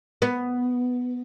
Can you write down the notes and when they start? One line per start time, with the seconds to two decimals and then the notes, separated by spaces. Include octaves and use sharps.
0.22 B3